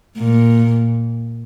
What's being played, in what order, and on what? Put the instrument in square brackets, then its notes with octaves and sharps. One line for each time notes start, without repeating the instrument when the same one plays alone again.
[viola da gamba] A#2